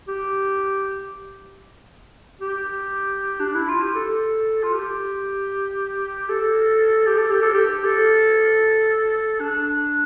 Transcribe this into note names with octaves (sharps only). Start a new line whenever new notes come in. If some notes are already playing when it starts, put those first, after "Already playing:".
G4
G4
D4
E4
F4
G4
A4
F4
G4
A4
G4
A4
G4
A4
G4
A4
D4